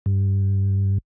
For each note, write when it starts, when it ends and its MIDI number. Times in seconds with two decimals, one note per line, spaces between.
0.06 0.98 43